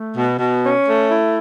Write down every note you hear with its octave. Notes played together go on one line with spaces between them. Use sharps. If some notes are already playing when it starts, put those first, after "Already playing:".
Already playing: A3
B2
B2
C#4
A3
E4